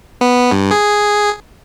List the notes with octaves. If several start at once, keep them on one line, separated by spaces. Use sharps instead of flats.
B3
G2
G#4